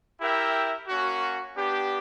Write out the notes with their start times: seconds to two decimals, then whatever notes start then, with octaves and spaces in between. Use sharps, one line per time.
0.20 E4 G4 A#4 E5 G5
0.87 A#3 C#4 F#4
1.55 B3 D4 G4